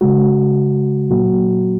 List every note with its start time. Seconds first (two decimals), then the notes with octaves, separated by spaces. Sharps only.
0.01 C#3 G#3 F#4
1.10 A#2 F#3 A#3 F#4